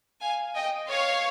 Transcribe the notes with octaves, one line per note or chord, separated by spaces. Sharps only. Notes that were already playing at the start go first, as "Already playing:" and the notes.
F5 G#5
D#5 G5
C#5 F5